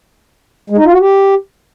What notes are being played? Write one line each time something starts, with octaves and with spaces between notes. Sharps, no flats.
G#3
D#4
F4
F#4
G4